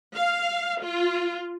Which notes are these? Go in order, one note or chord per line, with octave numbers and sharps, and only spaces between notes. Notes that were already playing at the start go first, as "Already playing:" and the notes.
F5
F4